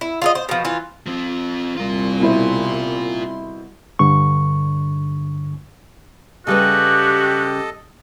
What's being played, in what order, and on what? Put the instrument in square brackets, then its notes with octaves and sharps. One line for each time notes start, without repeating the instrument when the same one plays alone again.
[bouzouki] E4
F4 A4 D#5
C5
B2 F3
E3 F4
[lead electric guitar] F3 C4
[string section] C2 C6 [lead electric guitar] F4 A#4
[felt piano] B2 E4 C5
[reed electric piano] G2 D3 C#6
[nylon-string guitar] C#3 G3 B4 [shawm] F#4 [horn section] G4 [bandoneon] A4 D#5